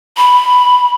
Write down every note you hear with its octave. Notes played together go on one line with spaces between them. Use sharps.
B5